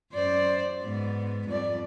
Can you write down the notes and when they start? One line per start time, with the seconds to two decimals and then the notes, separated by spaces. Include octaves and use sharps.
0.13 F#2 C5 D5
0.82 G#2 B3
1.48 F2 G3 D5